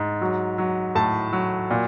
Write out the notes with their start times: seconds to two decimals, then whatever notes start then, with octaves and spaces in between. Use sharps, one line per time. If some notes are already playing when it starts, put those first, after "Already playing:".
Already playing: G#2
0.21 F#3
0.58 F#3
0.95 A2 A5
1.33 F#3
1.71 A#2